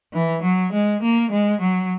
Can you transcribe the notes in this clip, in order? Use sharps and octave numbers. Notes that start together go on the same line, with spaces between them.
E3
F#3
G#3
A#3
G#3
F#3